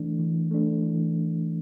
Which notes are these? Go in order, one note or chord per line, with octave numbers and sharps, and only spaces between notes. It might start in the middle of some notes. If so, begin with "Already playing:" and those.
Already playing: E3 A3 D4
E3
A3 D4
E3